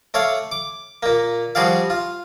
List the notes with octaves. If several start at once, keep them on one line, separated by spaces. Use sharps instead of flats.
A3 C#5 D5 F5
D6
A#2 A#3
F3 G3 F#4 G#4 D5 F5
F4